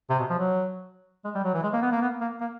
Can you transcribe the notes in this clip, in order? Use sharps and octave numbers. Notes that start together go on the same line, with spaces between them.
C3
B2
F3
F#3
G#3
G3
F#3
E3
G#3
A#3
B3
A#3
B3
A#3
A#3